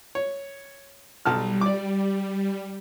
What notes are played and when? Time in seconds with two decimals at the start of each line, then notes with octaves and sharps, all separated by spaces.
0.15 C#5
1.26 B1 G3 A5 F6
1.61 D5 D6